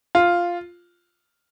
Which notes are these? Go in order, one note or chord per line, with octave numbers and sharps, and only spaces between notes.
F4